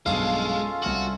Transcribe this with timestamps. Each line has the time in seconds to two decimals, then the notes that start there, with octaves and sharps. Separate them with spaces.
0.06 B1 G2 B2 G#3 C#4 F4 A4 F5
0.82 C2 F#4 F6 F#7